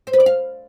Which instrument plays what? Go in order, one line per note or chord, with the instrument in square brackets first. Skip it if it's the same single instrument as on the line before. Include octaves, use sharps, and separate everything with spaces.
[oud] C5
B4
D5
F5